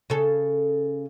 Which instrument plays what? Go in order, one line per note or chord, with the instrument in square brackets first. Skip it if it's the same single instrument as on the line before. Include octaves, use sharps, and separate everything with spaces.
[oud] C#3 A4